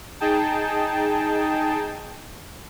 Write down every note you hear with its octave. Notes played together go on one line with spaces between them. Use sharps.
D#4 G#4 G5 A5